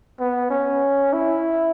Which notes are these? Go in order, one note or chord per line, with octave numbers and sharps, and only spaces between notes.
B3
C#4
E4